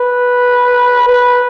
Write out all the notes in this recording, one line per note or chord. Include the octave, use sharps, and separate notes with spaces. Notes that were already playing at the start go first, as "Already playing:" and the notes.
Already playing: B4
B4